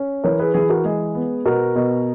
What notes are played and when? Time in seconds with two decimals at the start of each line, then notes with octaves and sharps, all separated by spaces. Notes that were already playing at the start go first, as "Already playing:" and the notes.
Already playing: C#4
0.24 E3 A#4 C#5
0.39 G#4 B4
0.54 E3 G#4
0.69 F#4 A#4
0.85 G#3 G#4
1.15 B3
1.46 B2 F#4 A#4
1.76 B2